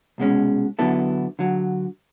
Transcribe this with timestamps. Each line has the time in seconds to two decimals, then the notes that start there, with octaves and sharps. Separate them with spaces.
0.18 C2 B2 G#3 C#4
0.79 D3 F#3 B3 E4 A4
1.39 D3 F#3